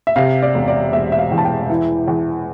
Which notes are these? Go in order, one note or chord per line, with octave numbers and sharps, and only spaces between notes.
E5
C3 F5
D5
E1
D5
E1 E5
E5
F5
E2
A5
G5
E3
E2